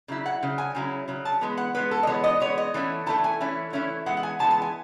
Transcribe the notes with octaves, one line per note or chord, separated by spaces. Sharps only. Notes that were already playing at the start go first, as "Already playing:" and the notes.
C#3 F#3 E4
F#5
C#3 F#3
G#5
C#3 F#3 C#4 E4
C#3 F#3
A5
E3 G#3 B3
F#5
E3 G#3 B3 B4
A4
D#5
E3 G#3 B3 C#5
D#5
E3 G#3 B3 C#5
D#5
E3 A3 C#4 E4
E3 A3 C#4 E4 A5
G#5
E3 A3 C#4 E4
E3 A3 C#4 E4
E3 G#3 B3 F#5
F#5
G#5
E3 G#3 B3 A5
A5
G#5